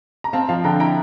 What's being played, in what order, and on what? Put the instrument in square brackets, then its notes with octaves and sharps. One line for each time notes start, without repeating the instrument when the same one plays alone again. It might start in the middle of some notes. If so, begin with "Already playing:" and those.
[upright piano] A#5
[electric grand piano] C4 [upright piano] F5 A5
[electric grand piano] F3 [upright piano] F5 A5
[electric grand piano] D3 [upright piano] G5 A#5
[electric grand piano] E4 [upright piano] G5 A#5